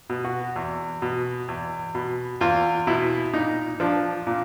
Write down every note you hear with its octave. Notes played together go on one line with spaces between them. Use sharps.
B2
F#4
E2
B2
E2
B2
E2 F4
B2 E4
A#2 D#4
F3 D4
A#2